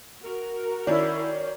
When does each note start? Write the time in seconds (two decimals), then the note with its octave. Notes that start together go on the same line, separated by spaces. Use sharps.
0.22 F#4 A#4
0.87 D#3 C#4 E4 D5